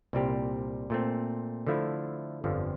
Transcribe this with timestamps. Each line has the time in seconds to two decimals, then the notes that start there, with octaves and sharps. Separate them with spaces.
0.13 C2 A#2 G3 C4 G4
0.90 A#2 A3 C4
1.67 D3 F3 A3 E4
2.44 G1 F2 D3 F3